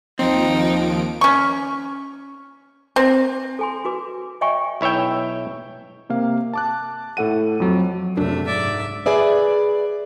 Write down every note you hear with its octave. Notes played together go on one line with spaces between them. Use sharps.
D#2 F3 C4 D#4 D7
C#4 C#6
C4
A4 G#5 C6
F#4 B4 D6
C#5 D#5 E5 G5 G#5 C#6
B1 E4 C#5 E5 G5
C3 A#3 F5
A5 D6 F#6
A2 A4 F#5 D#7
F2 F#3
C#2 F#2 C3 A3 D4
G#2 D5 E5
G#4 B4 D5 E5